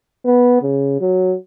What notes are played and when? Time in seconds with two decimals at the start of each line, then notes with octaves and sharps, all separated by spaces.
0.25 B3
0.62 C#3
1.01 F#3